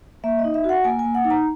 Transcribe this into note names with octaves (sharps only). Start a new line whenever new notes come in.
A#3 E5
D#5
D#4
E5
F#4 F#5
A#3 G#5
G#5
A#3
F#5
D#4
A#5